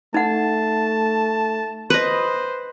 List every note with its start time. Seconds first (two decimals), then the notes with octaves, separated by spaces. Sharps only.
0.14 A3 D#4 F#5 A5
1.90 B4 C5 D#5